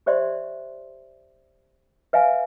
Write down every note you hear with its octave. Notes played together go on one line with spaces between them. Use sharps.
G4 C5 D5 E5 C6
B4 E5 F5 G#5